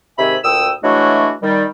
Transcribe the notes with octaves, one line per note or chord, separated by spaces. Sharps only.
G#2 C3 D#3 E5 G#5 B5
D2 A#2 G5 D#6 E6
E3 F#3 G#3 A3 D4 F#4
D#3 G3